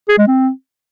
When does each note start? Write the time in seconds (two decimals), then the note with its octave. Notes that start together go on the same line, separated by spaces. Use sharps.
0.09 G#4
0.18 G#3
0.27 C4